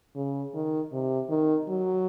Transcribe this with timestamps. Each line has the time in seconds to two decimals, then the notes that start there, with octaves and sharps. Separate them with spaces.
0.16 C#3
0.54 D#3
0.93 C3
1.30 D#3
1.69 F#3